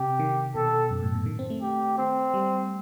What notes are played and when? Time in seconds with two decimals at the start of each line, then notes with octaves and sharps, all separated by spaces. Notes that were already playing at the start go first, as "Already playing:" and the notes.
Already playing: C3 G4
0.19 D#3
0.55 B2 A4
0.91 F#2
1.02 A2
1.14 B2
1.26 D#3
1.39 C4
1.50 A3
1.62 G4
1.98 C4
2.34 G3